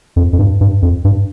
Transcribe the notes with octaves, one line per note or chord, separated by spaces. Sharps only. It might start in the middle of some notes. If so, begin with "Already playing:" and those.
F2
F2
G2
G2
F2
G2